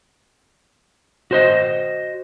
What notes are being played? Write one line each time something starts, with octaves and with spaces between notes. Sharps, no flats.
F#4 C5 D#5